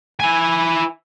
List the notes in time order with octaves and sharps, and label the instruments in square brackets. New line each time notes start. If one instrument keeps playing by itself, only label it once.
[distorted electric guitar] E4 G#5